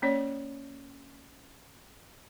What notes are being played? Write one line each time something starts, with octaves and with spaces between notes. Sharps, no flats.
A#3 C#4 C#5 D5